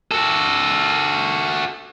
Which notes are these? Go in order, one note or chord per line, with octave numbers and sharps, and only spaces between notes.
F#4 A4